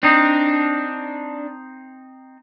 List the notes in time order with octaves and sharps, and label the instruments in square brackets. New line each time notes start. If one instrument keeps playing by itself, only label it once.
[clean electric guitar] C4 D#4 [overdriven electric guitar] D4